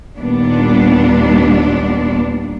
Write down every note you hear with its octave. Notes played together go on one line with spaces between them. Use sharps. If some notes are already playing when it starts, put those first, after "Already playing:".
D#2 A#2 G3 B3 D4